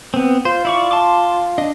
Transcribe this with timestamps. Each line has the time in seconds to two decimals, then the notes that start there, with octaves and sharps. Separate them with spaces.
0.14 B3 C4
0.45 F4 C5
0.65 E4 D5 C#6
0.91 A5 C6 D6
1.58 D4 D#5